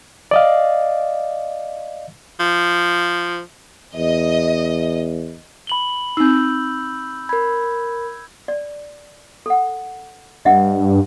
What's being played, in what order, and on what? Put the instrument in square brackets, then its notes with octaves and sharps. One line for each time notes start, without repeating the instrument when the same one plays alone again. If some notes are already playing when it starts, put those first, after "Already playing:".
[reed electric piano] D5 D#5 F5
[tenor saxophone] F3
[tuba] E2 [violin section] D#5
[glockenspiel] B5 F#7 G7
[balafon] C4 D#4 [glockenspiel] E6 G6
[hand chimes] A#4 B5 [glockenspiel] G#6
[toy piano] D5
A4 F#5
[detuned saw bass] G2 [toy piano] D#5 E5 F#5